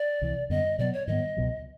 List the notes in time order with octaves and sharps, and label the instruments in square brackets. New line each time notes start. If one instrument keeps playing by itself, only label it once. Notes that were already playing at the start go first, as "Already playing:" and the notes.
Already playing: [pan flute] D5
[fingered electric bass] C2 C3 E3
[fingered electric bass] F#2 D3 G3 B3 [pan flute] D#5
[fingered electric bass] B2 F#3 B3 [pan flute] D5
[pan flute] C#5
[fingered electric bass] G#2 D#3 G3 B3 [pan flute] D#5
[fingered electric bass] C#2 B2 F#3